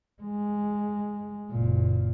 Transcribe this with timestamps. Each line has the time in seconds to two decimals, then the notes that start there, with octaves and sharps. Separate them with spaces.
0.22 G#3
1.50 F#1 A#2